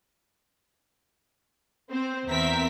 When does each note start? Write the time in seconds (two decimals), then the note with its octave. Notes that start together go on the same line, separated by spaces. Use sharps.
1.89 C4 C5
2.27 E2 C4 A#4 E5 B6